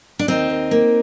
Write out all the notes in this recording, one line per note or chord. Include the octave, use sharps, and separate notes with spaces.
D4
D#2 C4 D#4
D#2
A#3